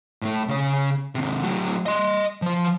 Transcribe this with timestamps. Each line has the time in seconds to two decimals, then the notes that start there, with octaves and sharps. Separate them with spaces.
0.22 A2 A3
0.48 C#3 C#5
1.15 D#2 C3
1.43 A2 F#3
1.86 D#5 C6
2.42 F3 C5